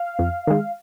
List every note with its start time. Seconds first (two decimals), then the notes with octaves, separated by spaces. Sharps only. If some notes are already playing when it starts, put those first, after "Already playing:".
Already playing: F5
0.19 F2
0.47 D#3 G#3